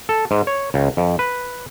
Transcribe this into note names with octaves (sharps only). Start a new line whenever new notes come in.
A4
G#2
C#5
C#2
F2
B4